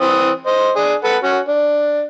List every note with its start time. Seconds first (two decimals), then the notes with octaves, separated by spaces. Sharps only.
0.01 E3 C4 D#6
0.46 C5 D#5
0.76 D4 G#4
1.04 A4 B4 F#5
1.23 C#4 F#4
1.48 D4